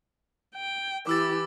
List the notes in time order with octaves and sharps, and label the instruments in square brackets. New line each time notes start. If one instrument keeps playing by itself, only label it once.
[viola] G5
[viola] E3 G4 [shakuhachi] E4 [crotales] D6 E6 A6